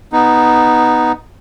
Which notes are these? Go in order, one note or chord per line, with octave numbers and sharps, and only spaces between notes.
B3 D#4